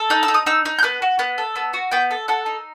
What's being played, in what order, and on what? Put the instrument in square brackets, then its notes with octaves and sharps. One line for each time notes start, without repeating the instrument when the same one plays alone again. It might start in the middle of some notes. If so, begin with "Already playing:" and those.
Already playing: [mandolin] A4
D#4 F#6
E6
D#4
D#6
D#4 E6
D#4
G6
B3 F#6
F#4
B3 F#6
A4
B3 E6
F#4
B3 G5
A4
A4 F#5
D#4